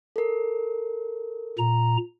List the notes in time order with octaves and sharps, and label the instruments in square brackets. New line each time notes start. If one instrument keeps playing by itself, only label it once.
[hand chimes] A4 A#4
[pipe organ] A#2 A#5